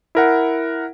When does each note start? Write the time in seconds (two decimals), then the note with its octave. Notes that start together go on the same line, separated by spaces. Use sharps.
0.15 E4 A#4 F#5